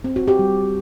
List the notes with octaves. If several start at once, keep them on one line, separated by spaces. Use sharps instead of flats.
C4
F#4
G4
G3